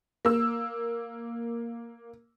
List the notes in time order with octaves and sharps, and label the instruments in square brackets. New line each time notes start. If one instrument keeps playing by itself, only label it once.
[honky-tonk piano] A#3 E6